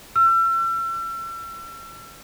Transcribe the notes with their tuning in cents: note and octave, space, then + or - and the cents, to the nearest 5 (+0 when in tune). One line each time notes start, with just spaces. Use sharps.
E6 +40